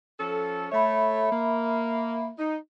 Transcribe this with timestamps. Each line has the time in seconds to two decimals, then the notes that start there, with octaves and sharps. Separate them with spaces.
0.19 F3 C#4 A4
0.72 A3 C#5 E5 B5
1.32 A#3
2.39 D#4